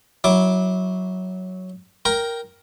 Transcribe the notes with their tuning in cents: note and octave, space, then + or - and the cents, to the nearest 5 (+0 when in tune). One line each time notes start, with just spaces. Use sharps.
F#3 +0 E4 -25 D6 +0
A#4 +0 G5 -5 A#5 +15